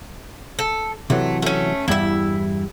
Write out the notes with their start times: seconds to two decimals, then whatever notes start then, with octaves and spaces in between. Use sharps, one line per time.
0.59 A4
1.10 C3 E3 F#3 A3
1.42 A3 C#4
1.88 E2 G2 G3 E4 E5